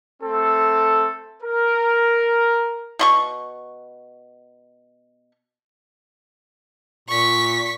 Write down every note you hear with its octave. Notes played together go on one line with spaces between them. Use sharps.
A3 C4 A4
A#4
B2 C6 C#6
A#2 C#6 B6